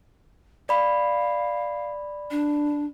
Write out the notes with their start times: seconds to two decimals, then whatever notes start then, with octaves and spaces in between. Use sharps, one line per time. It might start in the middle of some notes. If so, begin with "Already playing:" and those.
0.69 D5 F5 B5
2.31 D4